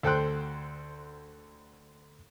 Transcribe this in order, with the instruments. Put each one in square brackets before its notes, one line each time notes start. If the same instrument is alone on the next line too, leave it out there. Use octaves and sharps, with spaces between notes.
[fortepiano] D2 A4 C5 G5 C6 F#6